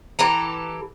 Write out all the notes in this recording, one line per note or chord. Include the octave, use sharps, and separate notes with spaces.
E3 G4 A4 A#5